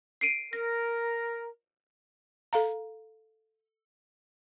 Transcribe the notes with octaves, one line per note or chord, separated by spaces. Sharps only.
C7 D7 D#7
A#4 A#6
A4 F5 A#5